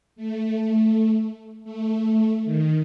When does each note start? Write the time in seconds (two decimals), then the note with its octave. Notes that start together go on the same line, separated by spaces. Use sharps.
0.16 A3
1.64 A3
2.45 D#3